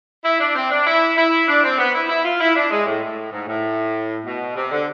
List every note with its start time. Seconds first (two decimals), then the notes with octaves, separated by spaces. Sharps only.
0.25 E4
0.40 D4
0.55 C4
0.71 D4
0.87 E4
1.17 E4
1.48 D4
1.64 C4
1.79 B3
1.95 E4
2.09 E4
2.25 F4
2.41 E4
2.55 D4
2.71 G#3
2.87 A2
3.02 A2
3.32 G#2
3.48 A2
4.25 B2
4.56 C3
4.71 D3